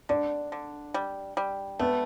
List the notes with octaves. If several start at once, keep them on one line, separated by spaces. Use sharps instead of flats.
D3 D4
D3
G3
G3
A3 B3